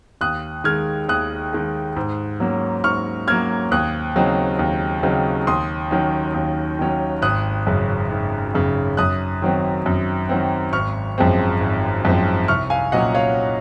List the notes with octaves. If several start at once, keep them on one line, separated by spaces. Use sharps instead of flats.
D#2 D#6 F#6
D#3 G#3 F6 G#6
D#2 D#6 F#6
D#3 G#3
G#2
F#3 A#3 C#4
G#2 C#6 F6
F#3 A#3 C#4 F6 G#6
D#2 D#6 F#6
C#3 F#3 C4 D#4
D#2
C#3 F#3 C4 D#4
D#2 C6 D#6
D#3 F#3 C#4
D#2
D#3 F#3 C#4
G#1 D#6 F#6
F#2 C#3
G#1
F#2 C#3
F#2 D#6 F#6
D#3 F#3 C4
F#2
D#3 F#3 C4
G#1 C#6 F6
F#2 F3 G#3 C4
G#1
F#2 F3 G#3 C4
C2 C#6 F6
F5 G#5
A#2 F#3 C#4 D#5 F#5
C#5 F5